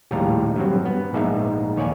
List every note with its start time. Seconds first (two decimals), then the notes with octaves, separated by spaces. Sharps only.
0.11 A#1 D#2 A2 G3 F5 A#5
0.56 G2 F#3 C4
0.85 B3
1.13 A#1 G#2 D#4 E5 F5
1.76 D#2 C#5 D5 G#5